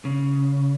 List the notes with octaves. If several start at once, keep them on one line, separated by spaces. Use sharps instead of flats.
C#3